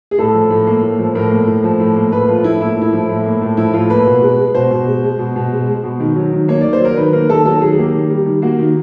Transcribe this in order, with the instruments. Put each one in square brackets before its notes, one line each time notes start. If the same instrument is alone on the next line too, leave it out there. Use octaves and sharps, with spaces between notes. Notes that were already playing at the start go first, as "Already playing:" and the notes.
[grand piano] G#4
A2 A4
F3
A2
A#3
A2
F3
A2 A#4
A#3
A2
F3
A2
A#3
A2 B4
F3 F4
A2 E4
A#3 E4
A2 E4
F3
A2
A#3
A2
F3 E4
A2 F4
A#3 B4
B2
G#3
G#3
B2 C5
B2
G#3
G#3
B2
B2
G#3
G#3
B2
D#3
F#3
D#3
A#3 C#5
D#3 D5
C5
F#3 A#4
D#3 B4
A#3 A#4
D#3 A4
F#3 A4
D#3 G#4
G#4
A#3 G4
D#3
G3
D#3
A#3 F#4
D#3